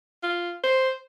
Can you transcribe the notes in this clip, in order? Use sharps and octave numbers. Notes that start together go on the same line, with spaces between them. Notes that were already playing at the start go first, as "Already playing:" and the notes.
F4
C5